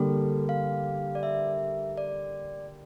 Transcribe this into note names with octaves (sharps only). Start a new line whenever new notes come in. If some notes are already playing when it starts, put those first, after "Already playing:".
Already playing: D3 G3 A#3 A4
F5
D5
E5
D5